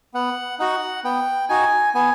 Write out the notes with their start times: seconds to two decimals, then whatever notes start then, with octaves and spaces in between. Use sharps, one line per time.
0.14 B3 F#5
0.59 D#4 F#4 F#5
1.04 B3 G5
1.49 D#4 F#4 G#5
1.94 B3 G#5